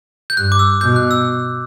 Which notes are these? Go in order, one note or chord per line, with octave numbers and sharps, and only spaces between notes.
G6
G2 F#6
D6
E6
B2 G6
F#6
E6